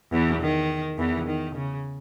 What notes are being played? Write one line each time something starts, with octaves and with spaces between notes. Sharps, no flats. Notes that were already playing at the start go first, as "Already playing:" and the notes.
E2 E3
D#3
E2 E3
D#3
C#3